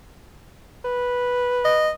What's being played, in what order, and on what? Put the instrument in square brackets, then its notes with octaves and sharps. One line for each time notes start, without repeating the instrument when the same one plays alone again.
[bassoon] B4
[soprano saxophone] D#5